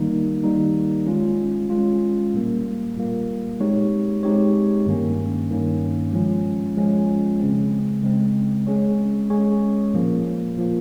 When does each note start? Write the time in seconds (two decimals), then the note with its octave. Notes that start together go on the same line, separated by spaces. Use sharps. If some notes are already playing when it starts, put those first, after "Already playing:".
Already playing: D#3 G3 A#3 D#4
0.44 D#3 G3 A#3 D#4
1.07 G#3 C#4 F4
1.70 G#3 C#4 F4
2.34 A#2 G3 A#3
2.96 A#2 G3 A#3
3.60 G#3 C4 D#4 G4 C#5
4.23 G#3 C4 D#4 G4 C#5
4.86 G2 D#3 A#3 C#4
5.50 G2 D#3 A#3 C#4
6.13 F3 G#3 C#4 F4
6.77 F3 G#3 C#4 F4
7.40 C#3 G#3 C4
8.03 C#3 G#3 C4
8.67 G#3 C#4 G#4 C#5
9.30 G#3 C#4 G#4 C#5
9.94 A#2 F3 A#3
10.56 A#2 F3 A#3